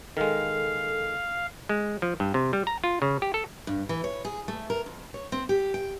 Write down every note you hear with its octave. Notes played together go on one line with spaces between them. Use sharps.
D#3 G#3 A4 F5
G#3
F3
G2
C3
G3
A#5
F4
C#3
G4
A4
G2
E3
C#5
G#4
A3
A#4
F2
C#5
C4
G4
G5